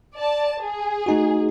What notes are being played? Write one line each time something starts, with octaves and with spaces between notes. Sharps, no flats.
D5 A5
G#4
A3 D#4 F#4